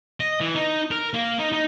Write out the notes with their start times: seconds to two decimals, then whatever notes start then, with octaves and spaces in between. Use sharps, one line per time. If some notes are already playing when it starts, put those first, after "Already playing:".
0.20 D#5
0.41 E3
0.55 D#4
0.91 A#4
1.14 A#3
1.39 D#4
1.52 D#4